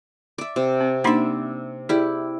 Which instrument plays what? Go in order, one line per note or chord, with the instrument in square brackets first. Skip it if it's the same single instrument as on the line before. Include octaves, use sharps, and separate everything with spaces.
[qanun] D5 E5
C3
[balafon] C4
[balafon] A#3 D4 D#4 [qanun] D5 E5
[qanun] E4 G4 [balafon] G#4 D5